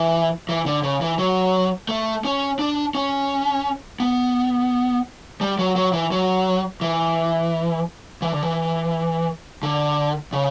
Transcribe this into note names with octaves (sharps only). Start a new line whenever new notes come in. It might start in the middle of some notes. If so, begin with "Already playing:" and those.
Already playing: E3
E3
D3
C#3
E3
F#3
A3
C#4
D4
C#4
B3
G3
F#3
F#3
E3
F#3
E3
E3
D3
E3
D3
C#3